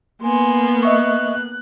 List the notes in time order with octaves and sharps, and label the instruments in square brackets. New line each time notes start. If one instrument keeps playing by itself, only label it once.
[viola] A#3 B3 [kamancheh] G#5 C6
[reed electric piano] D#5 E5 C#6 [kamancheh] F#6